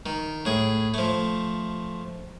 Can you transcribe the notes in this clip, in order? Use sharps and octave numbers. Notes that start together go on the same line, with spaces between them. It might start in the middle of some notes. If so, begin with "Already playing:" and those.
D#3
A2 G#4
F3 A3